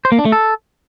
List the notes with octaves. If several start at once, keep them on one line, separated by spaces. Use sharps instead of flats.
C5
A#3
D4
A3
A4